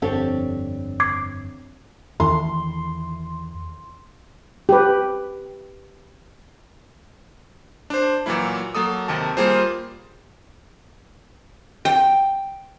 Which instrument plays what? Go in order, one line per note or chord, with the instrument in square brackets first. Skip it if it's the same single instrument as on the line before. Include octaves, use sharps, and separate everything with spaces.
[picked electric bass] G1 F2 [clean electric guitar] C4 D4 C#5 [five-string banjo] G4 A4
[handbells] D6 G#6 C7
[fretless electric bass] E2 D#3 [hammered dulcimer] C6
[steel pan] G4 B4
[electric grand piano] D4 C5
A#2 E3 F#3 A#3 E4
F#3 A#3 A4 D#6
D#2 C3 D#3 A5
G3 A#3 F4 G#4 C5
[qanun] G5